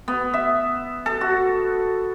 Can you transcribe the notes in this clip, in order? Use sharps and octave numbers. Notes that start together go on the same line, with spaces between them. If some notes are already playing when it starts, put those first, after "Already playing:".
B3
E5
A4
F#4